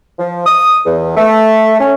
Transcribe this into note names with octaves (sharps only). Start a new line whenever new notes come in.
F3
D#6
E2
A3
C#4